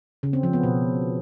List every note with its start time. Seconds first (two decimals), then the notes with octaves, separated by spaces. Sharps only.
0.23 C#3
0.33 C4
0.43 F3
0.53 B3
0.63 B2